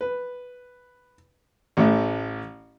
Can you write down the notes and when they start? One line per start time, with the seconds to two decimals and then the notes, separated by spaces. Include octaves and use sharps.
0.01 B4
1.77 A1 A2 A3